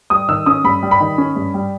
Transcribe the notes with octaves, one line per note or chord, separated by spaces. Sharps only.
G3 D#6
D#3 E6
C#4 D#6
G2 B5
G3
B5
D#3
C#4
G2
G3